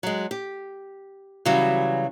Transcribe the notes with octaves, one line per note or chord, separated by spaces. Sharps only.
F#3 G#3
G4
C#3 E3 F#3 G3 F#4